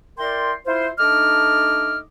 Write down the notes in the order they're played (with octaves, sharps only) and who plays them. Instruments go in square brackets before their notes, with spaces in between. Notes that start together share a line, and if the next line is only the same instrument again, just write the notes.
[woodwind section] E4 A#4 D5 G5 C6
E4 F4 C5
A3 D4 D#4 D#5 D6 F6